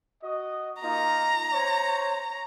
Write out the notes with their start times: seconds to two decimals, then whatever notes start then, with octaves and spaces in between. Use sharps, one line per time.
0.22 F#4 D#5
0.82 A#3 D#4 F4 A#5
1.52 C5 C#5